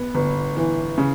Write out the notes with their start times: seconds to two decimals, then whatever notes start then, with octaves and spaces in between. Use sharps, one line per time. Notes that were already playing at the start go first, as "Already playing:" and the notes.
Already playing: B3
0.15 G1
0.57 E3
0.98 C#3